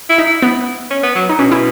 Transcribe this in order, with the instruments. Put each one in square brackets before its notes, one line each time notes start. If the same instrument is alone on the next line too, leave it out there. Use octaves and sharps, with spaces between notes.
[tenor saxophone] E4
[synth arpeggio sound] D#4
[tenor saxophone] E4
[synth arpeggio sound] B3
[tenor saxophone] C#4
B3
F#3
[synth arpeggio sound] D#4
[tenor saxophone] B2 [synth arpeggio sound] C#4
[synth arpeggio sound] E4